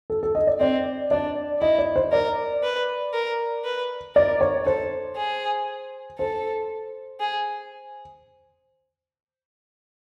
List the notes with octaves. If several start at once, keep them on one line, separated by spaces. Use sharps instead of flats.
A4
A4
D#5
D5
C4 D5
D4 D5
E4 D#5
D5
C5
A#4 D5
B4
A#4
B4
A#4 D5
C#5
A4 C5
G#4
A4 C5
G#4